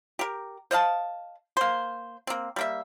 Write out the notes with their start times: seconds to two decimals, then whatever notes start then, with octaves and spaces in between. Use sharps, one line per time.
0.19 G4 A#4
0.71 C5 D#5 F5 A5
1.57 A#3 C5
2.27 A#3 C4
2.56 G3 A#3 E5